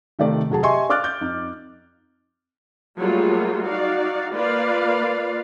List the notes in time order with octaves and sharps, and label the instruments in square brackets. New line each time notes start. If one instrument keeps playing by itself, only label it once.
[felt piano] C3 D#3 A3 D5
F1 F#3 G#4 A5
G4 D#5 E5 G#5 C6 C#6
D5 F5 D6 F6 F#6 A6
G6
F2 D#4
[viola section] F#3 G3 A3 A#3 F4 G#4
D#4 F#4 D5 F5
A#3 F4 B4 D5 F5